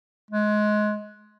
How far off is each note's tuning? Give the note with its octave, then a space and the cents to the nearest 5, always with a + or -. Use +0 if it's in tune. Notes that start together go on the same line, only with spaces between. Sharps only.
G#3 +20